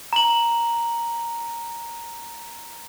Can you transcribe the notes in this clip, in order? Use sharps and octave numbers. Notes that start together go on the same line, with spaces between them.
A#5 F#7